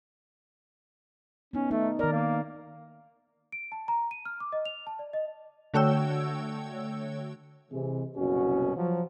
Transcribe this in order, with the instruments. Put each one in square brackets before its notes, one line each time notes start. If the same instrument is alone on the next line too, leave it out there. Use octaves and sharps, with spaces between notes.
[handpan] B3 D#4 [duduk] C#4
[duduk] A3 [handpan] D#4
[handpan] D#3 D5 [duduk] A#4
[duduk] A#3
[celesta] D7
A5
A#5
D#7
F6
D6
D#5
F7
A5
D5
D#5
[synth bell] D3 A3 F#4 C#5 G5 E6
[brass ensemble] C3 E3 G#3
F#1 C2 B2 C#4 F#4
F3 F#3